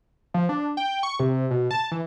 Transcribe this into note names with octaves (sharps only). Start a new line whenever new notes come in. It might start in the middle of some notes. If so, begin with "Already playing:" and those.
F3
D4
G5
C#6
C3
B2
A5
E3